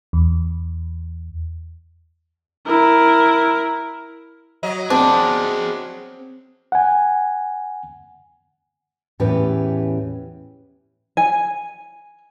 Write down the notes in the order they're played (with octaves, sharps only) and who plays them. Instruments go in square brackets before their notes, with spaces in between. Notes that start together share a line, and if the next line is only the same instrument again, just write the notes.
[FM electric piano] E2
[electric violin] E4 A#4
[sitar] F#3 D#5
[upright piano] C4 [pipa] D4 [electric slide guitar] G#4 D5
[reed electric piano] F#5 G#5
[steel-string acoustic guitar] E2 A2 E3 C#4 G4 B4
[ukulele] G#5